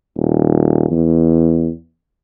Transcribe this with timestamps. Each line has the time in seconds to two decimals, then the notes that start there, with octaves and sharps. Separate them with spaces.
0.16 D#1
0.91 E2